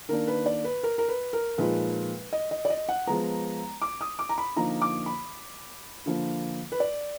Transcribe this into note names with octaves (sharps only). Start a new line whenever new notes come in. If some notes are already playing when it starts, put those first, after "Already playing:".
D#3 A#3 D4 A#4
B4
D5
B4
A#4
A#4
B4
A#4
A#2 F3 G#3 D#4 B4
D#5
D#5
D5
D#5
F#5
F3 G#3 B3 A#5
D6
D#6
D6
A#5
B5
D3 F3 A#3 D#4 A#5
D6
B5
D3 F3 A#3
B4
D5